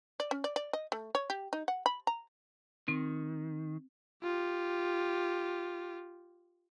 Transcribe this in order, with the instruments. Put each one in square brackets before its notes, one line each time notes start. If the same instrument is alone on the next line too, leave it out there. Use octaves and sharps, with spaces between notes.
[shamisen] D5
C#4
D5
D5
D#5
A3
C#5
G4
D#4
F#5
B5
A#5
[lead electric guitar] D#3 [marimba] C4
[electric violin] F4 G4